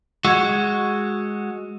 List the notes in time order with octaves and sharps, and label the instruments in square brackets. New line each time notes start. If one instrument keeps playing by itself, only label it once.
[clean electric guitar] G#3 F#4 [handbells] E6 G#6